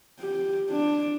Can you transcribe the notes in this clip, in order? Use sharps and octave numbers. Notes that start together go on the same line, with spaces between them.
G4
D4